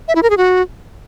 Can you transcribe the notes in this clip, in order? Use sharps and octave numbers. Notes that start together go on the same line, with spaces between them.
E5
E4
A#4
G#4
F#4